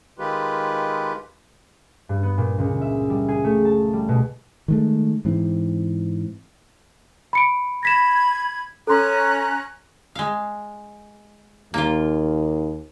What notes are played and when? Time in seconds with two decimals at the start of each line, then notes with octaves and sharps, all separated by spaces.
0.19 D#3 G#3 F4 G4 B4
2.09 G2
2.23 B3
2.38 A#2
2.58 C#2
2.81 E5
3.10 G3
3.28 G#4
3.44 A3
3.65 A5
3.93 G3
4.09 B2
4.68 D#3 G#3 A3
5.25 G#2 E3 C4
7.33 B5 C#7 D7
7.83 B5 G#6 A#6 B6 E7
8.87 C#4 A4 A#5 C6 F#6
10.15 G#3 F5
11.74 D#2 A#3 F4